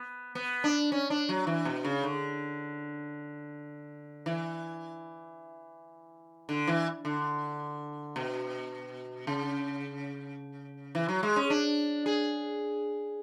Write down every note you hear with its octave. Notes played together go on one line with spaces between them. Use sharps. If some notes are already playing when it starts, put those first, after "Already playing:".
Already playing: B3
B3
D4
C#4
D4
F#3
E3
B2
C#3
D3
E3
D3
E3
D3
B2
C#3
E3
F#3
G#3
C#4
D4
G#4